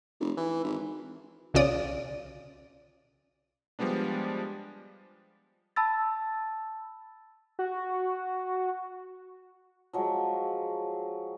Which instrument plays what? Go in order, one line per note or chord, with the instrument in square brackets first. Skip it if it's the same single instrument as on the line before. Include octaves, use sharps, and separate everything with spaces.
[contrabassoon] F1
E3
G#1
[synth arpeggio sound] B1 C#3 C#4 F4 D5 D#6
[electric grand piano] F3 G3 G#3 B3 D4
[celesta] A5 B5 E6 A6
[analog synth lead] F#4
[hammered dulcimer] F3 F#3 G#3